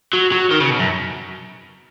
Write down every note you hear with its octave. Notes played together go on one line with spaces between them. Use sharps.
F#3
F#3
D#3
C#3
B2
F#2